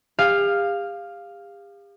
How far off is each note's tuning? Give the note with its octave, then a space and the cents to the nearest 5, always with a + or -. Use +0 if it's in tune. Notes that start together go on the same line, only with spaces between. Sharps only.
G4 +45 F5 +0